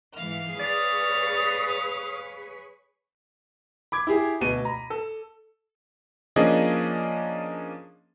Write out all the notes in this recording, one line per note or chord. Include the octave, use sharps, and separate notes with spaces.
G#2 E3 F5 F6
G#4 B4 C#5 D5 D#6
B5 D6 G#6
E4 G4 G#4
D2 B2 D#7
A#5 B5
A4
F3 A#3 C#4 D4 G#4 D#5